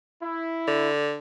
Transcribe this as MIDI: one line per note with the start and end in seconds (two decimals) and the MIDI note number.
0.21 0.88 64
0.68 1.18 50